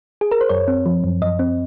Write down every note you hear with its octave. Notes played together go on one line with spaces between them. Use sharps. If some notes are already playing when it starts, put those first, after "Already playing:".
G#4
A#4
C5
F#2 C#5
C4
F3
F#2
F#2 D#5
C4